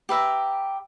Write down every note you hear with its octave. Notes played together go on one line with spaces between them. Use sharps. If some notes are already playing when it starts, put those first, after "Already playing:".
G4 B4 E5 A#5